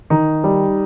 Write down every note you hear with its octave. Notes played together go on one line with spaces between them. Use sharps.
D#3 D#4
G3